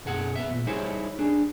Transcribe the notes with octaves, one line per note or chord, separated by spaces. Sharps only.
B1 F#2 G#4 F#5
B3 E5
A#2
G3 D#4 E4 G#4 C5 C#5
D4 G#4